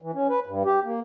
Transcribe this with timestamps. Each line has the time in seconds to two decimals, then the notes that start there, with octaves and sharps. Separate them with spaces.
0.02 E3
0.14 C#4
0.29 B4
0.46 G2
0.65 G4
0.84 A#3